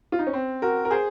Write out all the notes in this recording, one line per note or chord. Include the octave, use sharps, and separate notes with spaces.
F4
D#4
C#4
C4
F#4 A#4
A#4
G#4 C5